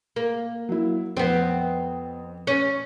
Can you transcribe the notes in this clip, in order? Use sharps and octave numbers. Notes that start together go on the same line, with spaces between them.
A#3
F#3 E4
F2 B3 C4
C#4